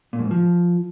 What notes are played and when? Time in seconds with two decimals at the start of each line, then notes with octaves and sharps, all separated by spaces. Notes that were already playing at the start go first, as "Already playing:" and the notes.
0.13 A#2
0.19 F#2
0.25 G#2
0.31 F3